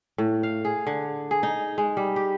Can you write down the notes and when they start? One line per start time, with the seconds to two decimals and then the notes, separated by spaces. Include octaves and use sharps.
0.18 A2
0.43 F5
0.65 G#4
0.87 D3
1.31 G#4
1.43 D#4
1.78 G#3
1.97 G3
2.16 G4